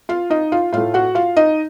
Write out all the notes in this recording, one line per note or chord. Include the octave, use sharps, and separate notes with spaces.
F4 F5
D#4 D#5
F4 F5
A2 A3 F4 F5
F#4 F#5
F4 F5
D#4 D#5